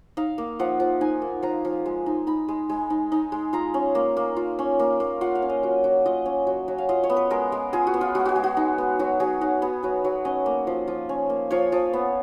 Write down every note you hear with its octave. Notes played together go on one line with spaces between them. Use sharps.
D#4 F5
A#3
F3 F#5
F3
D#4 G#5
A#3
F3 A#5
F3
G#3
D#4
D#4 B5
G#3
G#3
D#4
D#4
G#3
F4 A#5
C#4
A#3
A#3
F4
C#4
A#3
A#3
F4 F#5
F5
C#4
D#5
F#3
F#3
F4 D#5
C#4
F#3
F#3
F5
F4 D#5
C#5
B3
B4
G#3 A#4
G#3
F4 G#4
F#4
B3
F4
G#3 F#4
F#4 G#4
G#3
F#4
D#4
B3
F#3 F#4
F#3 G#4
D#4 F#4
B3 G#4
F#3 B4
F#3
C#4 D#5
A#3
F3
F3
C#4
A#3
F3 C#5
F3
B3